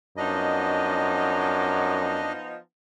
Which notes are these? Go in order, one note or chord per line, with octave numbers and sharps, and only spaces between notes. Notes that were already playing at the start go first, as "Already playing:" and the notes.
F#2 F3 B3 D4 D#4 D#5